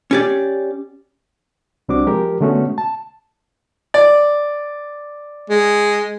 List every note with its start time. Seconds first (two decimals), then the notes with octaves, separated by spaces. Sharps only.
0.11 C#4 G4 D5
1.89 C2 G3 C4 D4 F#4 D6
2.07 F3 G#3 G4 A#4
2.41 D3 G#3 A3 B3 C#4 F#4
2.78 A5
3.94 D5
5.50 G#3